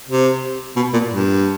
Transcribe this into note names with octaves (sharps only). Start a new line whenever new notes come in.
C3
B2
A#2
G2